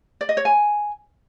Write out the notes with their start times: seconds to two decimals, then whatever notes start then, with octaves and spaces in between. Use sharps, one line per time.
0.21 D5
0.29 D#5
0.37 C#5
0.45 G#5